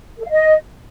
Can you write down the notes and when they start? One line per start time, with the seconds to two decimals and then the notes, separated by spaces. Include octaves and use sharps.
0.17 A4
0.23 F5
0.30 D#5